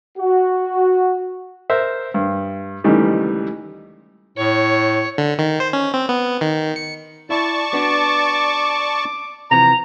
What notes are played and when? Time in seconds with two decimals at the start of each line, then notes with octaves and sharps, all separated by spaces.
0.17 F#4
1.70 A#4 C5 E5
2.14 G2
2.84 C#2 D#3 E3 G3 A3
4.38 A2 C#5
5.18 D3
5.39 D#3
5.60 C5
5.73 C#4
5.94 C4
6.09 B3
6.41 D#3
6.76 C#7
7.30 E4 D5 A5 C#6
7.73 B3 D4 F#4 D6
9.51 C3 E3 F3 A#5